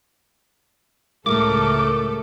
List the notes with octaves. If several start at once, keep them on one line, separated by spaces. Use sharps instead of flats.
C#2 A2 G#3 A3 A4 A#4 D6